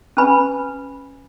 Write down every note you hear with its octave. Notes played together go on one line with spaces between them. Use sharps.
C#4 B4 G#5 B5